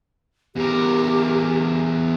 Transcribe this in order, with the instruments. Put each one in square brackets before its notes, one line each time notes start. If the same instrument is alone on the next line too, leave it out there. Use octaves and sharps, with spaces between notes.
[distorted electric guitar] E2 A#4 [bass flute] G4